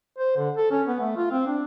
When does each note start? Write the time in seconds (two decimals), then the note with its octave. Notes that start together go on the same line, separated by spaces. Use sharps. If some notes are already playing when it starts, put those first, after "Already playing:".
0.18 C5
0.37 D3
0.57 A4
0.71 C#4
0.87 B3
1.00 A3
1.17 F4
1.31 C4
1.47 D4